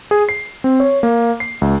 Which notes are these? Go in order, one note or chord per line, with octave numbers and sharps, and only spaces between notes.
G#4
C7
C4
C#5
A#3
C7
C#2